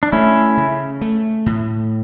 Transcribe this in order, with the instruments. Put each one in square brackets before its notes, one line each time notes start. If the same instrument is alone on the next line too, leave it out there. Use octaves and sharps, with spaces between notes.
[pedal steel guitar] D4
[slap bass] A3 [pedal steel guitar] C#4 E4
[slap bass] C#3
A3
A2